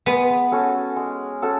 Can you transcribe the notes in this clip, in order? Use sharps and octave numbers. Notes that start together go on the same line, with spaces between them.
G#3 B3
C#4 F#4 A4
G#3
C#4 F#4 A4